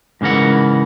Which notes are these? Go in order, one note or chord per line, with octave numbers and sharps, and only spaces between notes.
G#2 C#3 E3 A#4 F#5